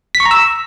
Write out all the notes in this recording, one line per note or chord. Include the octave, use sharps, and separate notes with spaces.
B6
C#6
A#5
E6